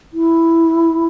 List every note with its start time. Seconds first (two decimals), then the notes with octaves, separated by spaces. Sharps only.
0.13 E4